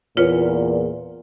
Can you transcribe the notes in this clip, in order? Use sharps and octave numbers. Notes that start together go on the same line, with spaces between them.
E2 A#2 F4 B4 C#5